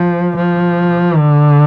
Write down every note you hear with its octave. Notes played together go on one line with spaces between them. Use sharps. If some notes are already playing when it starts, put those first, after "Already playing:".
Already playing: F3
F3
D3